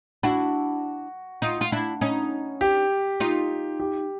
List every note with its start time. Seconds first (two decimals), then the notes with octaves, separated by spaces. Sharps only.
0.23 D4 E4 F#4
1.42 D#4 F4
1.61 F4
1.72 D4 E4
2.01 C#4 D#4
2.61 G4
3.20 D#4 F4
3.80 G4